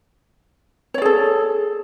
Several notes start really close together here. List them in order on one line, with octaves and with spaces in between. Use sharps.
C#5 D5 G#4 A4